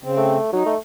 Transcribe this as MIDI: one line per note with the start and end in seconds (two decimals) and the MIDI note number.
0.04 0.37 49
0.04 0.37 60
0.17 0.53 57
0.53 0.65 54
0.53 0.74 63
0.66 0.78 57